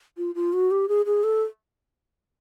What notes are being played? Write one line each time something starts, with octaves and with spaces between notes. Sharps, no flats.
F4
F4
F#4
G4
G#4
G#4
A4